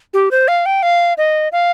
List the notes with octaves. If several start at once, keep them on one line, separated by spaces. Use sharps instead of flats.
G4
C5
F5
G5
F5
D#5
F5